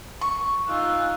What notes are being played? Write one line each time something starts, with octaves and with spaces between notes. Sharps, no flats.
C#6
D#4 F4 G#5 E6 F#6